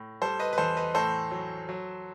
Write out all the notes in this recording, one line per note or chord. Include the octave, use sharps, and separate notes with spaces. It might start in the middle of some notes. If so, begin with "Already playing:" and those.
Already playing: A2
G3 A4 C5
B4 D#5
B4
E2 A4 C5
B4 D#5
A2 A4 C5
F#3
F#3